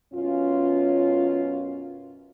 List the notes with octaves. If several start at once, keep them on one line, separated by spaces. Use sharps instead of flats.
F#2 B2 C#4 F4